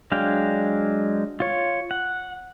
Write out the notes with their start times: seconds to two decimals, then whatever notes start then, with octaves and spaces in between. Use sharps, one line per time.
0.12 F#3 G#3 D4 F5 G5
1.40 F4 C#5
1.91 F#5